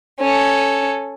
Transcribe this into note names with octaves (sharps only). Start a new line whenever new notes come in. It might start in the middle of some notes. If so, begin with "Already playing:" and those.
C#4 A4